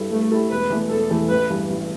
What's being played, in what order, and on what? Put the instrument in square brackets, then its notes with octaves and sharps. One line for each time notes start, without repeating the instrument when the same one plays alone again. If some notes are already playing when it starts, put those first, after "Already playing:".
Already playing: [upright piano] G2 G3 E4 A4
[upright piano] G2 [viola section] A3
[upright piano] G3 E4 A4
[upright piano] E1 [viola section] B4
[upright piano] E2 E3 A3
[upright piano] E1 [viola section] A4
[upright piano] E2 E3 A3
[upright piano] A1 [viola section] B4
[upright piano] G2 E3
A1